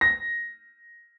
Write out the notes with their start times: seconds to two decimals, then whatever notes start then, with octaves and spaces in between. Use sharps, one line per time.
0.01 A#6